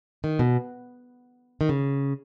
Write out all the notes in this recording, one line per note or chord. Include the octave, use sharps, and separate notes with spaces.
D#3
B2
D#3
C#3